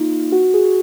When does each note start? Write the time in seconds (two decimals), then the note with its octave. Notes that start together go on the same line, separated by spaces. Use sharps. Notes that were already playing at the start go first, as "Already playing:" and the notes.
Already playing: A#3 D#4 F4
0.32 F#4
0.54 G#4